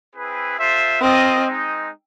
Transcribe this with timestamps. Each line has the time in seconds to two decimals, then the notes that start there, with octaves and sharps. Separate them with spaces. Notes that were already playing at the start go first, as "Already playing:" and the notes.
0.14 C4 E4 G#4 B4
0.58 F4 A4 C5 E5
1.01 C4 F4 A#4 D#5
1.45 G#3 C4 D#4